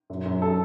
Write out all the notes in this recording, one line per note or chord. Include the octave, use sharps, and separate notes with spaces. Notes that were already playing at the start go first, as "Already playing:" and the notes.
F#2
F#2
A4